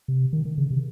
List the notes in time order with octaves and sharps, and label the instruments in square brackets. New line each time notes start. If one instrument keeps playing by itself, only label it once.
[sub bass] C3
D#3
D#3
C#3
C3